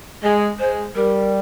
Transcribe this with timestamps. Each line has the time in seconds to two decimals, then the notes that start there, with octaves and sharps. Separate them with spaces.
0.23 G#3 D#5
0.59 G#3 C5
0.96 G3 A#4